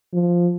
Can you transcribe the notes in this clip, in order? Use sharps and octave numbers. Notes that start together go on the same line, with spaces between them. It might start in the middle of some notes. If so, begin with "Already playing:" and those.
F3